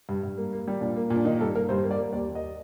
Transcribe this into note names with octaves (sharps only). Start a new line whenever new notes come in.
G2
G2
A#3
A#3
G3
A#2 D4
A#3
A#2
D4
D#3 D#4
G2 A4
A#3 A#4
G2 C5
A#3
D5
A#3
D#2 D5
D#2
D#5